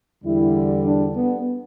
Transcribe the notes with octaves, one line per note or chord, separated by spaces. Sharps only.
E2 D3 G3 E4
D4
B3